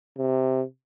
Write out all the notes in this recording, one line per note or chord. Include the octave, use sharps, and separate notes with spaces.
C3